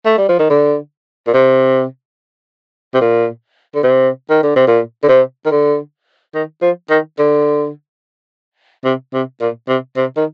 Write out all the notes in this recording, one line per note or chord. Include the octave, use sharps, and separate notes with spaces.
A3
G3
F3
D#3
D3
A#2
C3
C3
A#2
D3
C3
D#3
D3
C3
A#2
D3
C3
D#3
D3
D#3
F3
D#3
D3
C3
C3
A#2
C3
C3
D#3